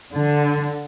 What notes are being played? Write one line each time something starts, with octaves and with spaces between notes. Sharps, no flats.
D3